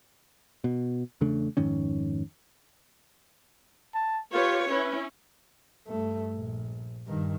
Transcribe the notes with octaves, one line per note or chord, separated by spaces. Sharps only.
B2
E2 C#3 A3 D4
F2 G#2 D#3 C#4
A5
F4 G4 B4 C#5
C#4 E4 B4
G2 A3
A#1
G2 D#3